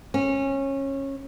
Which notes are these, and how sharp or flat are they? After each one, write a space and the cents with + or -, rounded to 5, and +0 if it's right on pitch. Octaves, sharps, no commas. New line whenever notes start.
C#4 -20